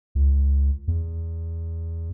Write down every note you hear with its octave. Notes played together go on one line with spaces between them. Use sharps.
C#2
E2